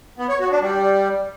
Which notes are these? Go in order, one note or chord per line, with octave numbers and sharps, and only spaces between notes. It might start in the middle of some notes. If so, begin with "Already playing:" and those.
B3
C#5
F#4
D4
G3